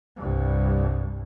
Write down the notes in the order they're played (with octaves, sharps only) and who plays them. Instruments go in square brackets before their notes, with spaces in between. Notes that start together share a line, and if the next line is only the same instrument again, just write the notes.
[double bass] C2 G2